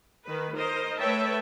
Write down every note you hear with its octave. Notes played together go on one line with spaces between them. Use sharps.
D#3 B4
A#4 C5 D#5
A3 B4 C#5 E5 G5 A5